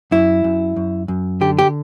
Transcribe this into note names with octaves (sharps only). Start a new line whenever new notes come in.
F#2 E4
F#2
F#2
F#2
D3 G4
G4